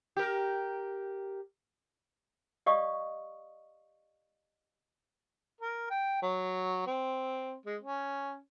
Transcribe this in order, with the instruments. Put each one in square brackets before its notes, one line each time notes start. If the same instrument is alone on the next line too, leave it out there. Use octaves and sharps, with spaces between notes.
[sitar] G4 A#4
[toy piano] G4 D5 D#5 F5 C#6 D#6
[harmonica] A#4
G5
F#3
C4
G#3
C#4